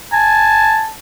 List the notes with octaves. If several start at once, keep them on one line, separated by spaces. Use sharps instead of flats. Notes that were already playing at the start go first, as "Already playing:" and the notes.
G#5 A5